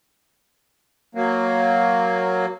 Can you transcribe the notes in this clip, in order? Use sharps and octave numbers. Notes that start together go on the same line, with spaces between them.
F#3 A#3